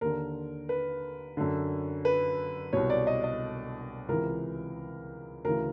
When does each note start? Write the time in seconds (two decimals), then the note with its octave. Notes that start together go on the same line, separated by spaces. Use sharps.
0.01 D#2 D3 A#4
0.69 B4
1.37 F#2 D3
2.05 B4
2.73 C2 B2 C#5
2.90 D5
3.07 D#5
3.24 D#5
4.08 C#2 C3 E3 A#4
5.44 D2 C#3 E3 A#4